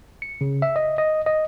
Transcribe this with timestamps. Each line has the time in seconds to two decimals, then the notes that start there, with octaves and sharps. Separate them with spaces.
0.22 C#7
0.41 C#3
0.62 E5
0.76 D#5
0.98 D#5
1.26 D#5